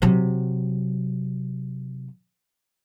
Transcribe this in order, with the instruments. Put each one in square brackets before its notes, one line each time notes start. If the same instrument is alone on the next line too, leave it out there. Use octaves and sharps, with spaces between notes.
[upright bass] C3 F#3